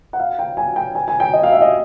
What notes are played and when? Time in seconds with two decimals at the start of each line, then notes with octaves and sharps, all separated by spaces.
0.13 F#5
0.20 F5
0.39 G5
0.57 G#5
0.76 G5
0.95 G#5
1.08 G#5
1.20 G5
1.33 D#5
1.43 F5
1.52 E5
1.62 D#5